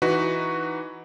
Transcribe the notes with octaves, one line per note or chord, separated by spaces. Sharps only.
E3 D#4 F#4 B4